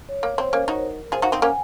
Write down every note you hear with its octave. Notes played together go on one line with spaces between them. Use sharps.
C#5
A#3 C#5
C4 C5
A#3 C#4 A#4
D#4 F#4
F4 G#4 C5
D#4 F#4 F5
C4 D#4 F#5
A#3 C#4 G#5